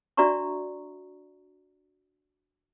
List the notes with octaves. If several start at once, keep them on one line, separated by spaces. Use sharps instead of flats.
D4 F#4 D5 E5 A#5 C#6